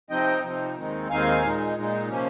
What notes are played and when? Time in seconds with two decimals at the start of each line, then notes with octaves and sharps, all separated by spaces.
0.10 C3 F3 C4 D#4 D#5 G5
0.43 C3 F3 C4 D#4
0.77 D#2 D#3 G#3 C4 D#4
1.09 D#2 D#3 G#3 C4 D#4 F5 G#5
1.43 A#2 G#3 D#4
1.76 A#2 G#3 D#4
2.09 C3 F3 A#3 C#4